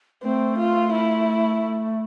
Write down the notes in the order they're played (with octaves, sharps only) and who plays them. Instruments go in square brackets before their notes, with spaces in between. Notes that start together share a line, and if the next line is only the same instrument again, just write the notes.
[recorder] A3 [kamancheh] C4
[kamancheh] F4
E4